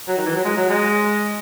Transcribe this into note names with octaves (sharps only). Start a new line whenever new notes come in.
F#3
D#3
E3
F#3
G#3
F#3
G#3